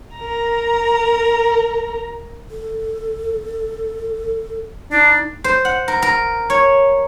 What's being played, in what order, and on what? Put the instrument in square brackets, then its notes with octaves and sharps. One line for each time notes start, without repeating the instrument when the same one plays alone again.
[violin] A#4 A#5
[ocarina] A4
[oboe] D4 [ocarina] D#4
[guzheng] C5
F#5
A#4
A#4
C#5